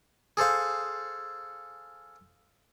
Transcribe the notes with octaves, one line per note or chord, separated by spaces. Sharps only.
G#4 A4 C5 F5